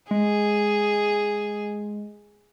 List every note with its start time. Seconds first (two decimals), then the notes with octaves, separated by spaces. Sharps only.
0.11 G#3 G#4